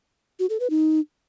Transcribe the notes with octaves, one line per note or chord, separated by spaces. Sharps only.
F#4
A4
B4
D#4